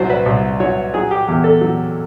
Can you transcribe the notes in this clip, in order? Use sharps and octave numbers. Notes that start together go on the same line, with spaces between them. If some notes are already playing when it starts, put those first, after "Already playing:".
Already playing: C2 F#3 C5
B4
C2
F#3 C#5
F#3 G#4
G4
E2 G4
A4
F#3